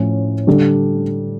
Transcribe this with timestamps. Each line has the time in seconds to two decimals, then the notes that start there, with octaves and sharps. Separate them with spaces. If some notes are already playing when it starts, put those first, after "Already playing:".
Already playing: A2 F3 C#4 E4
0.47 D3 G3 D4 A4 D5